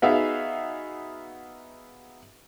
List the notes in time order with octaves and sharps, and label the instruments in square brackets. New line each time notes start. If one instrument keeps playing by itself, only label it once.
[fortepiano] B3 D#4 F#4 G#4 E5 F5